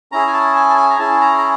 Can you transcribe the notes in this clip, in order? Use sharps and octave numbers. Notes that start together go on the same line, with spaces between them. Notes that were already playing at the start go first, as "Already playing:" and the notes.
C#4 E4 G#4 A#5
G#5
A5
G#5
A5
G#5
A#5
C#4 E4 G#4 A5
A#5
A#5